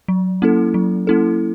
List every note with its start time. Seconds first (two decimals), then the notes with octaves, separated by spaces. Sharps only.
0.08 F#3
0.42 A#3 C#4 E4 A4
0.74 F#3
1.07 A#3 C#4 E4 A4